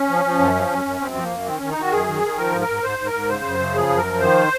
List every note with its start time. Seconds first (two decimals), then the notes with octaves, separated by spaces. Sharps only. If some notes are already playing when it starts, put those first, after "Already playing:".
Already playing: C#4
0.09 F3
0.25 F3
0.39 F#2
0.55 F3
0.71 F#2
0.85 F#2
1.00 F#2 C4
1.15 F3
1.23 A#3
1.30 F#2
1.46 D#3 C4
1.58 D#3 C#4
1.70 D#4
1.77 D#3 F#4
1.91 F#2 G#4
2.07 D#3
2.23 D#3
2.37 F3 A#4
2.52 G#2
2.61 A#4
2.68 G#2
2.83 G#2 C5
2.98 G#2
3.06 A#4
3.13 G#2
3.29 C#3 C5
3.44 F#2
3.59 C#3
3.74 F3 G#4
3.89 F#2
3.97 A#4
4.06 F3
4.20 D#3 C5